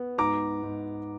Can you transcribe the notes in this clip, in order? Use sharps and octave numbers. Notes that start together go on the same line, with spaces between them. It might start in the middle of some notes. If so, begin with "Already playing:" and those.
Already playing: B3
G#2 A#5 D6
G#2